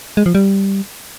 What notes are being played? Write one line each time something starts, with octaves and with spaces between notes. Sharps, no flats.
G#3
F3
G3